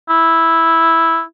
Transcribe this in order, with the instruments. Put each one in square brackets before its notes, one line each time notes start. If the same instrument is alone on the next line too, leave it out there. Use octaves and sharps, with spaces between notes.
[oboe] E4